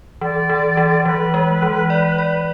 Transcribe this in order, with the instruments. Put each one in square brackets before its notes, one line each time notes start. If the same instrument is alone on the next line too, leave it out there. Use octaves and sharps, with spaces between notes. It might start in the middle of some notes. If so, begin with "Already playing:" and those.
[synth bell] E3 [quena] D5
[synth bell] E3
E3
[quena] C#5
[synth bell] E3 [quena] B4
[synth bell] G#3
E3
D5
D5